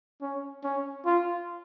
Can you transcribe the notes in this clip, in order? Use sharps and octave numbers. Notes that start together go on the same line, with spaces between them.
C#4
C#4
F4